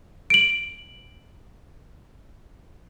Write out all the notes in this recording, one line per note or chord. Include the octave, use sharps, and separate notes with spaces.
D7 F#7